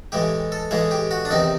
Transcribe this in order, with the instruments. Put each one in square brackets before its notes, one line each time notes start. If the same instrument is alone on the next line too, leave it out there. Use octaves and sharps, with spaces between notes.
[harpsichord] A2 E3 G#3 G4
A4
A2 E3 G#3 G#4
G4
F#4
D4
E2 C3 D#3 D#4